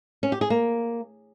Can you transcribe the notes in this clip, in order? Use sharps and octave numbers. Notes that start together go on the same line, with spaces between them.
C#4
G4
G#4
A#3